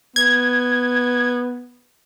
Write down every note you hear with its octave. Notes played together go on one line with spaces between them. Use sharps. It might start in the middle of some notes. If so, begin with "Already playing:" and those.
B3 G#6